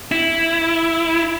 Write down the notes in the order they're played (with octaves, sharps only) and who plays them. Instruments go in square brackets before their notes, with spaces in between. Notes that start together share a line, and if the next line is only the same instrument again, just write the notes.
[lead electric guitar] E4